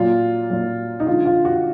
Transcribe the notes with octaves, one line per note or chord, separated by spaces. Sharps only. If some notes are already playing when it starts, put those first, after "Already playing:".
Already playing: A#2 F#3 F4
A#2 F#3
D#4
D3 G#3 F4
F4
F#4